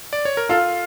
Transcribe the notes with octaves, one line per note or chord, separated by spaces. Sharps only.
D5
C#5
A#4
F4 A4